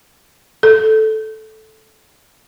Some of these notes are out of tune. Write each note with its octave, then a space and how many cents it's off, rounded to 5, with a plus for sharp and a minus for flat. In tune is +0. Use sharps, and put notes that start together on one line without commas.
A4 -10